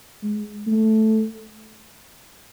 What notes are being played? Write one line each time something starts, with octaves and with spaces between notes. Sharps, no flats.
G#3
A3